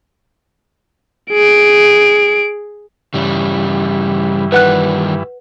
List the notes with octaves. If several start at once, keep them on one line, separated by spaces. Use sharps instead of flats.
G#4 D7
G2 C#3 E3 G3
D#3 G3 B4 F#5 F#6